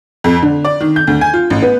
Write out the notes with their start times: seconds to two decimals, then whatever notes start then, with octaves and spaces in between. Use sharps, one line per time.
0.24 F2
0.42 D3
0.65 D5
0.80 D#3
0.96 G6
1.07 D2
1.21 G#5
1.33 F4
1.50 A1
1.62 B3